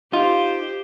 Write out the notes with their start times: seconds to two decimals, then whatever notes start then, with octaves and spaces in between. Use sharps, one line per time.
0.13 D#4 F4 G4 C5